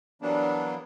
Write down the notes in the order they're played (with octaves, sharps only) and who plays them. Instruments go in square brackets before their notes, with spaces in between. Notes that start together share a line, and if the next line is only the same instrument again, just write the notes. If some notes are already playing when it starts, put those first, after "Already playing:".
[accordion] E3 F#3 G3 A#3 B3 D4